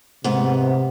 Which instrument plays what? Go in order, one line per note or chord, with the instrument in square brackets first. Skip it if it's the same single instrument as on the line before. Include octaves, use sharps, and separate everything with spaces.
[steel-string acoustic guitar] G#2 B3 [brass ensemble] C3